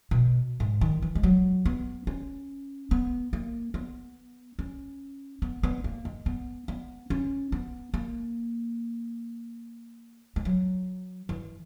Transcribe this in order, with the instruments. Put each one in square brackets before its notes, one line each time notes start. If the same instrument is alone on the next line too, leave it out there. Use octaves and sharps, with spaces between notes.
[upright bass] B2
G#2
D#3
E3
G#3
F#3
B3
C#4
B3
A#3
B3
C#4
B3
B3
A#3
G#3
B3
B3
C#4
B3
A#3
G#3
F#3
E3